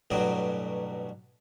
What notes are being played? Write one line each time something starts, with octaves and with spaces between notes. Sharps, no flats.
A1 G2 B2 F#3